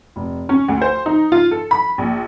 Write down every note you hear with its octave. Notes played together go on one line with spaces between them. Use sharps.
F1
C#4
D2
C5
D#4
F4
A4
B5
A#1